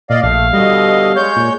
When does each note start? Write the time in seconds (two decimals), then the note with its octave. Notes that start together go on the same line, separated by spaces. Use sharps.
0.10 A#2 D5 D#5 F5
0.23 A#1 A3 F5
0.53 B2 D3 G3 D#5
1.16 G#3 C#5 G6
1.36 A#2